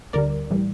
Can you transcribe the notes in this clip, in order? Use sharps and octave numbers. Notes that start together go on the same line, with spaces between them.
D2 D3 G3 A#4 D5
A2 E3 G3